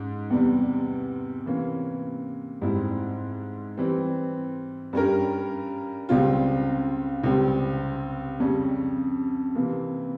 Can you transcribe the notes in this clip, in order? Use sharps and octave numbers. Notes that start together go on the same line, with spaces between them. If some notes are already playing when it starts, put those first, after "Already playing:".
Already playing: G#2 C#4
E2 C3 G3
C3 E3 A#3 C#4
G#2 G3 C4 E4
E3 G3 C4
G2 G3 C#4 G4 A#4
C#2 C#3 G3 C4 F4
C#2 C3 G3 C4
F2 C#3 G3 C#4
C3 E3 A#3